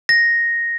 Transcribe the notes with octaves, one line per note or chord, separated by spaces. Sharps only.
A#6